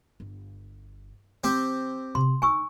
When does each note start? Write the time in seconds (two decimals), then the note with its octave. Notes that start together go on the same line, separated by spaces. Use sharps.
0.20 G1
1.44 E3 C4 G4
2.15 C3 C6
2.42 D2 D#4 G#5 C#6 E6